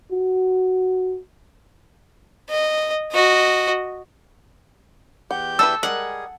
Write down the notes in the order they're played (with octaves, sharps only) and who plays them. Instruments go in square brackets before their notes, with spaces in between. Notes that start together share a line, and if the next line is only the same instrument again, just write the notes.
[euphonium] F#4
[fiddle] D#5
F#4 D#5
[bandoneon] E2 G4 G6 [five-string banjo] F#5
[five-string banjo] D4 E4 B4 [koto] A4 [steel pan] E6
[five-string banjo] G3 G#3 A#4 [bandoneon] G#4 [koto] F#5